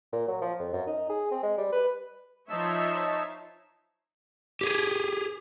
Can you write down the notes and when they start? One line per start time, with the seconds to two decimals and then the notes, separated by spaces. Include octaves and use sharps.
0.12 A#2
0.28 F#3
0.42 F3
0.59 F2
0.73 F#2
0.87 D#4
1.10 G#4
1.31 C4
1.43 G#3
1.58 G3
1.72 B4
2.50 F3 D#4 C#5 E5 A5 E6
4.61 G4 G#4